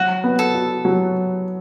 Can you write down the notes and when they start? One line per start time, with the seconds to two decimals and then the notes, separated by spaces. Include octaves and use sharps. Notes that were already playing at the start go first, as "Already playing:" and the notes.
Already playing: F#3 F#4
0.24 B3
0.39 A4
0.54 F#4
0.85 F#3